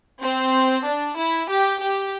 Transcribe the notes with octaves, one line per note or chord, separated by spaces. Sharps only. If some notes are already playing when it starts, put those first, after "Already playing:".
C4
D4
E4
G4
G4